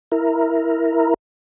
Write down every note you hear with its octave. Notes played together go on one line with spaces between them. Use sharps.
E4 A#4